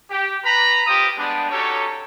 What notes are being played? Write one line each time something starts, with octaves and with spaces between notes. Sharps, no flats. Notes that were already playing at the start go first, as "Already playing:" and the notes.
G4
B4 A#5 B5
F4 G4 C5 A#5 D#6
G3 G#3 B3 D4
C#4 D#4 F#4 G4 A4 C#5